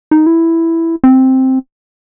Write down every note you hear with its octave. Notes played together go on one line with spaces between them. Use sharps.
D#4
E4
C4